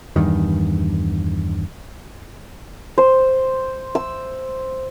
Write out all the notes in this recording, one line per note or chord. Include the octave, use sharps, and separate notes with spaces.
E2 G2 D#3
C5
E6